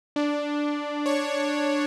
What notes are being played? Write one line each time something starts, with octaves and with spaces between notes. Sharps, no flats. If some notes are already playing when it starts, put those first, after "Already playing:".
D4
C#5